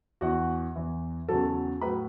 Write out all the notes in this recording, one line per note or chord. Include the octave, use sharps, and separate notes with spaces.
E2 E3 F#4 F#5
E2 E3
E2 C#3 F#3 A4 A5
A2 F#3 B4 B5